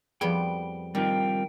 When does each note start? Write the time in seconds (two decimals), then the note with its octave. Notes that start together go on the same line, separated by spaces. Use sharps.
0.21 F2 F3 G3 B3 G#4 G5
0.95 D#3 G3 C4 F4 G5